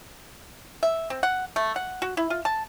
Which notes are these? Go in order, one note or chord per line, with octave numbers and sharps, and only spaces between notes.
E5
C4
F#5
A3
F#5
F#4
E4
F4
A5